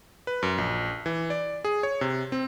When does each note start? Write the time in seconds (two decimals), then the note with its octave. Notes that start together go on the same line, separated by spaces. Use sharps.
0.27 B4
0.43 F#2
0.58 A#1
1.06 E3
1.30 D5
1.64 G#4
1.83 C#5
2.01 C3
2.32 C4